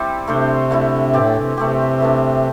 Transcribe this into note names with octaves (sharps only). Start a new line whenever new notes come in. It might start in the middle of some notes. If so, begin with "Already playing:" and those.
Already playing: G3 C4 E4 G4 D5
C3 A3 D4 C5
D3 A3 E4
A2 E3 C4 G4 D5
C3
C3 A3 C4 G4
E3 A3 D4